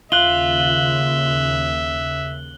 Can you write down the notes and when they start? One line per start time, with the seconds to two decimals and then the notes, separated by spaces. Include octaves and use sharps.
0.12 D#2 C#3 F4 E5 F#6 F#7 G7